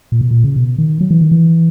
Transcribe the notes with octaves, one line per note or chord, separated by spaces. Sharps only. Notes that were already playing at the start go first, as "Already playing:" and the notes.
A#2
B2
A#2
C#3
B2
D#3
F#3
E3
D#3
E3